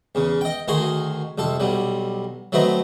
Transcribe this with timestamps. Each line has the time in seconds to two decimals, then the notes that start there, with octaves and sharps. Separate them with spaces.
0.15 E2 C#3
0.41 D#5 G5
0.68 D2 D#3 F#4 G#4 G#5 C6
1.38 C2 F2 A4
1.60 B1 F#3 G3
2.52 F#3 A3 B3 C4 D#4